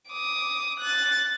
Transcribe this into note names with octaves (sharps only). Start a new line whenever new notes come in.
D6 D#6
F#6 A6